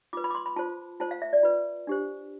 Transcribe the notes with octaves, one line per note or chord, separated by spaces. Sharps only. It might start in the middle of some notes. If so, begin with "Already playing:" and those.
F4 B4 D6
B5
D6
C6
B5
F4 C5 A5
F4 C5 A5
F5
E5
D5
F4 B4
D4 G4 C5